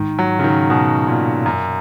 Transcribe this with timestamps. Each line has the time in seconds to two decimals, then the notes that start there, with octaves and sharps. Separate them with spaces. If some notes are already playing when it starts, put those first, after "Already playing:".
Already playing: G#2 D#3
0.19 F#3
0.39 C#3
0.44 D#3
0.70 B2
1.07 A#2
1.46 F#2